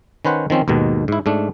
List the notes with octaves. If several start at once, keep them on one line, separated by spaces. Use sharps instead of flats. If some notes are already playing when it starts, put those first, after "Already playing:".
D#3 C#4 B4 C5 F#5
D#3 F3 C4 C#4
D#2 G#2 B2 D#3
G#2 E4
G#2 A3 D4